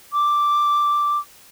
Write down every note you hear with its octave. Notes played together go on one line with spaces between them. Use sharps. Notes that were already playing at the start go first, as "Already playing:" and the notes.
D6